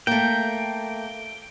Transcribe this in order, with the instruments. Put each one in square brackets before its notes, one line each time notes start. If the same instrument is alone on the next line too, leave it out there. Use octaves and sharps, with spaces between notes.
[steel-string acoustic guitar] A3 A#3 [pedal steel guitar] G5